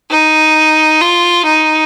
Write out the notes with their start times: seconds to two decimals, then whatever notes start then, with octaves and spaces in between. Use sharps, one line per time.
0.11 D#4
1.01 F4
1.46 D#4